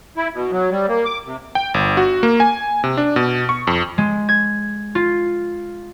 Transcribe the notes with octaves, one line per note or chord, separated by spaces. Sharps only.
E4
B2
F#3
G3
A#3
D6
C3
G5
G1
F#4
A#3
G#5
C3
D4
B2
C#6
F2
G#3
G#6
F4